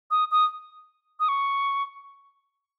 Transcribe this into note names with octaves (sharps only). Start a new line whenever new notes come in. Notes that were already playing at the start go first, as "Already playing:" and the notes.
D#6
D#6
D#6
C#6